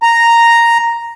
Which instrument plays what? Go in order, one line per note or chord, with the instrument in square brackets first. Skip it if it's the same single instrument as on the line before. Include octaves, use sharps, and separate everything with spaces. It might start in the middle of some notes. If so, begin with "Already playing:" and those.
[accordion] A#5